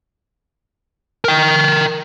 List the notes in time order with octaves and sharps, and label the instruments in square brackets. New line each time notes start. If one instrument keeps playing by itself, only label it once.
[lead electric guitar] A#4 G5